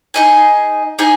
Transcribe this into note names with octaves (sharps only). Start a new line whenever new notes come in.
D#4 G#4 D#5 G#5
D#4 G#4 D#5 G#5